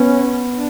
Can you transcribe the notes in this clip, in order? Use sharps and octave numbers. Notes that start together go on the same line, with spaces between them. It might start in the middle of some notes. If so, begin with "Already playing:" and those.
Already playing: B3 C#4
D4